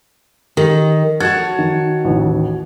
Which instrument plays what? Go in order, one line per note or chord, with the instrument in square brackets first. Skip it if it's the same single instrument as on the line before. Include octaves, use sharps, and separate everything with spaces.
[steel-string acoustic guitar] D#3 [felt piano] G4
[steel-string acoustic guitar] F#4 C#5 A5 [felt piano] G#6 A6
[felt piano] D#3
A1 D#2